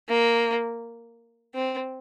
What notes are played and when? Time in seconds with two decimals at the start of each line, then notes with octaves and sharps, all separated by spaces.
0.08 A#3
1.55 C4